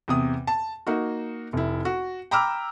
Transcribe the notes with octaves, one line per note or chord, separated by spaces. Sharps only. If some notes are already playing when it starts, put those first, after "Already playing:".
E2 C3 D#6
A5
A#3 D#4 F#4
F1 E4
F#4
G5 A#5 B5 D6 E6 F6